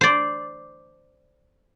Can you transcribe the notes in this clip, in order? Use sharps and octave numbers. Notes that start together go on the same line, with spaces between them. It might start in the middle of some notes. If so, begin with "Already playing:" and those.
C5 D5